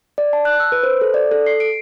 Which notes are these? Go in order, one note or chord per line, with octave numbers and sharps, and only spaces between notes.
D5
A5
F#6
E6
B4
C5
A4
D5
A4
C7
D7